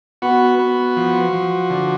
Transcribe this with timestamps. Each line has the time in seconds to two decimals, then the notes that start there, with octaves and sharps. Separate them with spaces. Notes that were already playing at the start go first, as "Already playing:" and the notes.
0.22 B3 F#4
0.59 B3
0.97 F3
1.33 F3
1.70 D3